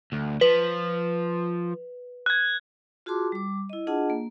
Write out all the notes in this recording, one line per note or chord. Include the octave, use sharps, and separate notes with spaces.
D2
F3 B4
F#6 G#6
F4 F#4 G#4 A5 C6 D6
G3 D6
E4 D#5
D4 F4 G#4 D#5 F#5 A5
A#3